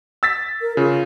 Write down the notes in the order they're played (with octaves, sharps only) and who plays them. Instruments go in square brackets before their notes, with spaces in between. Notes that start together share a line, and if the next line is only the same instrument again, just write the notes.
[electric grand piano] E6 A6 B6
[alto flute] A#4
[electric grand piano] C#3 [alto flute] F4